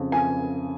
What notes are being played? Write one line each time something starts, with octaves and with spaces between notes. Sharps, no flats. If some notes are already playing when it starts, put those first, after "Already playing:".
Already playing: F2 C#3
F2 G#5